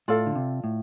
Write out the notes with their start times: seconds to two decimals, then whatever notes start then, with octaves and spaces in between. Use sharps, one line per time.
0.08 A2 F4 A4 D5 F5
0.26 D3
0.36 C3
0.64 A2